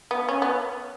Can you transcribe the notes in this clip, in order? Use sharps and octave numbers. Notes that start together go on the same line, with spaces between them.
B3
C#4
B3